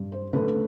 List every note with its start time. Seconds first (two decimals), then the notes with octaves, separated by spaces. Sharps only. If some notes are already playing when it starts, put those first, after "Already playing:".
Already playing: G2
0.12 C5
0.33 D3 A3 B4